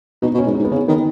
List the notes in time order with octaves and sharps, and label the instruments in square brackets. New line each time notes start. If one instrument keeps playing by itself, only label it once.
[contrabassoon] B2 [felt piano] D#4
[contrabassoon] B2
[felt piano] C#4
[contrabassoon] G#2
[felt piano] D#4
[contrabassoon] G#2
[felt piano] B3
[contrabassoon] C#3 [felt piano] C#4
[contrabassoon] D#3 [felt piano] B3